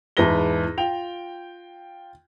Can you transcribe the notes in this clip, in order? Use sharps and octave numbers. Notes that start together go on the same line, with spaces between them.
E2 G#2 B4 A5 A#6 G7
F4 G5 F7